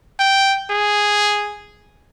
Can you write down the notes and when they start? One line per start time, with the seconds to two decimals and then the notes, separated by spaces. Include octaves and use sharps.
0.19 G5
0.70 G#4